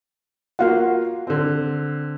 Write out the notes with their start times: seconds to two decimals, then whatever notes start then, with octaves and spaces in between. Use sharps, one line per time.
0.59 A#3 F4 F#4 F5 F#5
1.27 D3 C4